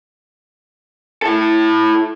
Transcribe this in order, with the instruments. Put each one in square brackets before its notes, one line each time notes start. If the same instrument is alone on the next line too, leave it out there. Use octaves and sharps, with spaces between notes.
[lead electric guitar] E4 A4